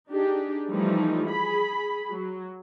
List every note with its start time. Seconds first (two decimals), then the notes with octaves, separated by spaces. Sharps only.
0.10 D4 D#4 G4 G#4
0.69 E3 F3 G3 A3 D#4
1.28 G#4 B5
2.11 F#3